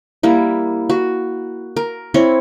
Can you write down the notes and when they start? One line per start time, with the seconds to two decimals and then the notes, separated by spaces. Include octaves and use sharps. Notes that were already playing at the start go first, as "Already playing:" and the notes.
0.23 G3 A#3 E4
0.90 F#4
1.76 A#4
2.14 C4 E4 C#5